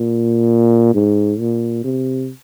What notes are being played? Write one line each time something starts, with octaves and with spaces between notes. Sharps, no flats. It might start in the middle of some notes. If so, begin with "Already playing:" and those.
Already playing: A#2
G#2
A#2
C3